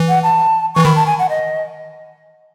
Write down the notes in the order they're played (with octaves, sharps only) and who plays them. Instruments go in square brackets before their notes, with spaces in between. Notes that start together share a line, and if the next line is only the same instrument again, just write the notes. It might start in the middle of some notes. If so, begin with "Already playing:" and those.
Already playing: [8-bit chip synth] E3
[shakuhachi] F#5
A5
[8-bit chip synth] E3 [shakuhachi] C#6
[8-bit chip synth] D#3 [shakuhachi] B5
[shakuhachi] A5
G#5
F#5
D#5